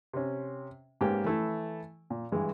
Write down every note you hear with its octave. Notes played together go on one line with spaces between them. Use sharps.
C3 C#4
G#2 A#3 C#4 G4 B4
E3 A3 E4
A#2
G2 E3 G#3